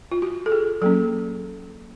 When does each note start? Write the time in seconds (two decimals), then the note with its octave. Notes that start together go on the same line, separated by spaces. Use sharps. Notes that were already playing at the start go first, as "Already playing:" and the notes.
0.11 F4
0.22 F#4
0.46 A4
0.52 G#4
0.82 F#3 A#3 C#4 A4